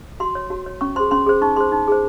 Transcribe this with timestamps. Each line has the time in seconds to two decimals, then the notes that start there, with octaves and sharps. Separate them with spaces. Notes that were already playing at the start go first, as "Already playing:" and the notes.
0.20 F#4 C6
0.35 C#5
0.50 F#4
0.66 C#5
0.81 C#4 C#6
0.96 G#4 C5 C6
1.11 C#4 C6
1.26 G#4 C5
1.42 D#4 C#6
1.56 G#4 C5 C6
1.72 D#4
1.88 G#4 C5